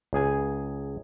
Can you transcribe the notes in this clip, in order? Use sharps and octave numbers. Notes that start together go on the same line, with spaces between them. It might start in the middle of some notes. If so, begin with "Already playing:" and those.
C#2 G#4 G#5